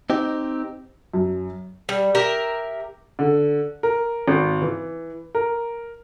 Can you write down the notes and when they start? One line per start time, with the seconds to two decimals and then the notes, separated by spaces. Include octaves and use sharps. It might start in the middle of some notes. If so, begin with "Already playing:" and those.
0.10 C4 D#4 G4
1.14 F#2
1.89 G3
2.15 G4 A#4 E5
3.19 D3
3.83 A#4
4.28 G#1
4.62 E3
5.35 A#4